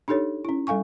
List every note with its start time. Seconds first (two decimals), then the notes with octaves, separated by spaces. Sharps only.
0.08 D4 D#4 G4 A4 C#5
0.45 C#4 E4
0.67 G3 A4 F5 G#5 C#6